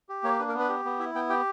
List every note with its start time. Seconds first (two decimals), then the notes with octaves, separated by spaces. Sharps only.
0.09 G4
0.24 A#3 C#5
0.39 D4 B4
0.49 A#4
0.54 B3
0.59 B4
0.69 G4
0.85 B3
0.99 E4 E5
1.15 B3 G5
1.29 G4 G5